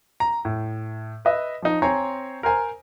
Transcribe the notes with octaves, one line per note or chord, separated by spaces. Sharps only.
A#5
A2
B4 D#5 E5
F3 D#4
C4 C5 C#5 G#5 A#5
A#4 C5 G#5 A#5